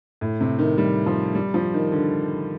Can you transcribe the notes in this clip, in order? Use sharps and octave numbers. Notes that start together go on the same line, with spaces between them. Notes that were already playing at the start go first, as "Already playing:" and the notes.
A2
C3
D#3
G3
F3
G3
F3
D#3
D3